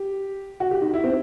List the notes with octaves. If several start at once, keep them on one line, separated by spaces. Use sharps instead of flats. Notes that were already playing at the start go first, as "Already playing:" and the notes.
Already playing: G4
F#4
G4
D#4
E4
C4